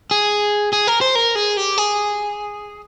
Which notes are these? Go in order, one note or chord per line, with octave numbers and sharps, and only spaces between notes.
G#4
G#4
A#4
C5
A#4
G#4
G4
G#4